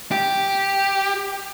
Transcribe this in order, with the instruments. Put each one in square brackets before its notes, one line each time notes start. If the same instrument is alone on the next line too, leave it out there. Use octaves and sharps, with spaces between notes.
[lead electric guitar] G4